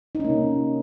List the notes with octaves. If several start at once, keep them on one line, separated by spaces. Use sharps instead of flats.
C3 A#3 C#4 D#4